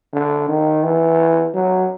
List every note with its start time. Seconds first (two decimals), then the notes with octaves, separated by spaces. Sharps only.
0.13 D3
0.49 D#3
0.84 E3
1.54 F#3